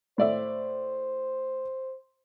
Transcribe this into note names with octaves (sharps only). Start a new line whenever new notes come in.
A2 C5 D5 E5